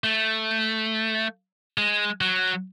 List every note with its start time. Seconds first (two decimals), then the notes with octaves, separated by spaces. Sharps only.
0.04 A3
1.78 G#3
2.21 F#3